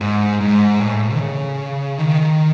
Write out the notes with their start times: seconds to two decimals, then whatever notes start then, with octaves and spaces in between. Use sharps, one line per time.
0.01 G#2
0.40 G#2
0.80 A2
1.14 D#3
1.19 C#3
1.98 D#3